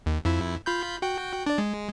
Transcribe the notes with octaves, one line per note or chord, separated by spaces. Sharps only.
D#2
F2 E4
F4 B5 G6
F#4 G5
D4 D5
G#3